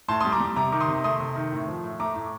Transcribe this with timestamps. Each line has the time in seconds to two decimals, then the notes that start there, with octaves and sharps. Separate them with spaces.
0.08 A2 A5 C6
0.20 G3 C6 D#6
0.32 A#5 D6
0.40 G3
0.56 C3 A#5 D6
0.72 D#3 D6
0.80 C6 D#6
0.88 C3
1.04 A3 C6 D#6
1.20 C3
1.36 D#3
1.52 A2
1.67 F3
1.84 A2
2.00 A3 A#5 D6
2.16 A2